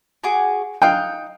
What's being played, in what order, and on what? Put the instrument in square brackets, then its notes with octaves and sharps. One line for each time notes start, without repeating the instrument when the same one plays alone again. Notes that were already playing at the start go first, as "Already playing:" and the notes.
[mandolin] F#4 G#4 D6
[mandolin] D#4 F#6 [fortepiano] F5 G5